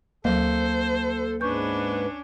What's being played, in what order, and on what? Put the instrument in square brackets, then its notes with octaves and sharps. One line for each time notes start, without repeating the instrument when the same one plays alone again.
[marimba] D2 F#3 [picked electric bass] A#3 [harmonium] A4 [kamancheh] C5
[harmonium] G#2 B4 [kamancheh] C#4 D4 [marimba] C#6 G6